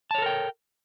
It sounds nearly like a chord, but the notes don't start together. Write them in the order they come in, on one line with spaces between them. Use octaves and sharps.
A5 C#5 A4 A#4 G5